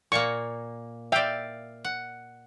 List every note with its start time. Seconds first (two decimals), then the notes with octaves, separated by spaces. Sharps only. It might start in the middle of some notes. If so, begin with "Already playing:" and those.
0.12 A#2 A#3 C#6
1.12 D5 E5 F5 G5
1.84 F#5